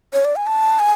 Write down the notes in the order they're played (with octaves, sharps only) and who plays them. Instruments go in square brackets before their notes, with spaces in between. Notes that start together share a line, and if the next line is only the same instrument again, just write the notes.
[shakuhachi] C#5
D5
G#5
A5
G#5